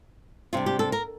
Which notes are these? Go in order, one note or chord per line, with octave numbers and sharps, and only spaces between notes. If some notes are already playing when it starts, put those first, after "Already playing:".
C3 G3 D4 F4
G4
A4
A#4